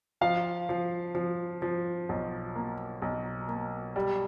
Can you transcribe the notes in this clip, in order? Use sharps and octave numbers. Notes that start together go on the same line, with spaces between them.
F3 F5
F3
F3
F3
B1
A#3
B1
A#3
G3